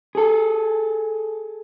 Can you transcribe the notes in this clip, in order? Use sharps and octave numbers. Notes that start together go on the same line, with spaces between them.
G#4 A4